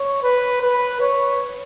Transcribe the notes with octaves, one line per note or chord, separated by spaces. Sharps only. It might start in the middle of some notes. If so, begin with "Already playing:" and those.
Already playing: C#5
B4
B4
C#5